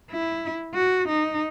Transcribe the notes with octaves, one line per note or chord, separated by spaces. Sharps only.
E4
F#4
D#4